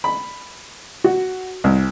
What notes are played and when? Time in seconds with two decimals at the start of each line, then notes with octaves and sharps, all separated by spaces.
0.04 B5
1.04 F#4
1.64 C2